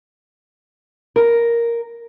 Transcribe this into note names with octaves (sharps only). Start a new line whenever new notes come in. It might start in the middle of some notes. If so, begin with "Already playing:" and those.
A#4